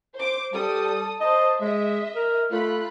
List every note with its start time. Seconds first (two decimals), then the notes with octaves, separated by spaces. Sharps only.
0.15 C5 D6
0.53 G3 A4 D5 D#6
1.20 C5 D#5 A5
1.61 G#3 D#5 E5
2.16 A#4
2.52 A3 F4 B5 F#6